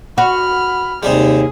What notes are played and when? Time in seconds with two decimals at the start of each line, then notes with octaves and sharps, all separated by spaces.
0.18 F#4 B5 F6
1.03 D#2 C3 G3 G#3 G#4